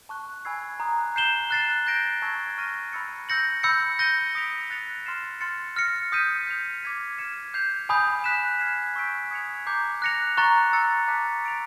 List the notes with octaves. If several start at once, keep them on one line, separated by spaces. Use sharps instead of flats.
A5 C#6 F#6
G#5 B5 E6 G#6 C7
A#5 D#6 F#6
G6 C7 E7 G7
F#6 A6 C7 E7
G6 A#6 D7
A5 C#6 E6 G#6
C#6 F6 A#6 D#7
B5 E6 A6 C#7
E6 G6 A#6 C#7 F#7
B5 E6 G6 A#6 C#7
G6 A#6 D#7 G7
D#6 G6 B6 D7 F7
F#6 A6 C#7 F7
C6 F6 A6 C7 E7
C6 F6 A6 C#7
F6 A#6 C#7
D#6 G6 B6 D#7
G6 C7 F7
D6 F6 G#6 B6 D#7
F6 G#6 C#7 E7
G6 C7 F7
G#5 B5 D#6 G6
F#6 B6 E7
F6 G#6 C7 E7
C#6 E6 G6 B6 D7
D#6 G#6 C#7 F7
A#5 D6 G6 C7
F#6 A#6 C#7 F7
A#5 C#6 F#6 A6
C#6 E6 A6 C#7
A5 D6 F#6 B6
E6 A6 D7 F7